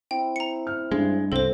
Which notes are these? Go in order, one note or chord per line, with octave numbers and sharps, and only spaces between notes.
C4 E4 G5
A#5 C#7
F6
G2 G#3
C2 C4 A4 C5